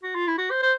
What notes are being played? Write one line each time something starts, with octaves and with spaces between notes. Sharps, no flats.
F#4
F4
E4
F#4
C5
C5